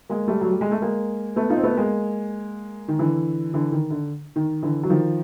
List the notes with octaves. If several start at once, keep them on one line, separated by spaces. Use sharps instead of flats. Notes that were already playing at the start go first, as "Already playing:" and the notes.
G#3 A#3
G3 A3
F#3
G3
G#3
A3
G#3 A#3
A3 B3
D#4 F4
C4
A3 B3
G#3 A#3
D#3
D3 E3
D3 E3
D#3
D3
D#3
D3 E3
F#3
D#3 F3